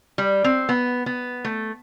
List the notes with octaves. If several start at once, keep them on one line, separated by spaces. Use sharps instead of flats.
G3
C4
B3
B3
A3